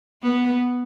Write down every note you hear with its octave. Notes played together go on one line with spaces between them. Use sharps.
B3